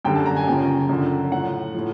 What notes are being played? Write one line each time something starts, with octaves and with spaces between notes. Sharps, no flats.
F#2 D3 G3 G5
A5
A#5
G#5
F#2 C#3 F3 G5
F#2 D3 F3
A2 F3 F#5
A2 F3